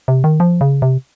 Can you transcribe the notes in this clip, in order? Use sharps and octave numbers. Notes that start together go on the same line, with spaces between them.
C3
D#3
F3
C#3
C3